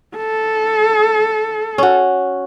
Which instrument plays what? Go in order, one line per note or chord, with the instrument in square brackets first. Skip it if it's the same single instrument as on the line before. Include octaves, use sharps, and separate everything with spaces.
[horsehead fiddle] A4
[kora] C#4 F#4